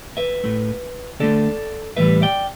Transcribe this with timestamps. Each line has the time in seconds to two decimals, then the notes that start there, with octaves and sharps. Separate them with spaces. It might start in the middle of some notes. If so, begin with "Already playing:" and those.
0.17 B4 E5
0.43 A2 A3
1.20 D2 D3 A3 A4 D5
1.97 A2 E3 G3 B4 E5
2.22 D5 G5